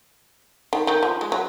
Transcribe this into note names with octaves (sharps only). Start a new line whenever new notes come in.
D#3
D#3
F3
G#3
F#3